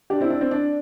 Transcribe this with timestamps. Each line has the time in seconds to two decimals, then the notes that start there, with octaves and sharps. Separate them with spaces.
0.10 D4 G4
0.21 C4 E4
0.31 D4
0.41 C4
0.51 D4